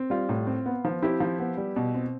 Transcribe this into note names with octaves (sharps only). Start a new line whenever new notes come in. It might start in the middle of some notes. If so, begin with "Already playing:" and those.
Already playing: C4
G3 F4
A2
C4
B3
F3
C4 E4 G4
F3
B3
G3
B2
C4